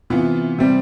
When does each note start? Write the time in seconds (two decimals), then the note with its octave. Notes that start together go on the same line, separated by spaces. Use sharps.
0.10 C3 E3 B3 F4
0.59 C3 G3 C4